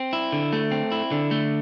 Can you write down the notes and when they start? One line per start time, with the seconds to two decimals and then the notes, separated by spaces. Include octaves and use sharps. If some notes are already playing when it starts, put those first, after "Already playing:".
Already playing: C4
0.13 E4
0.32 D3
0.53 A3
0.71 C4
0.92 E4
1.12 D3
1.31 A3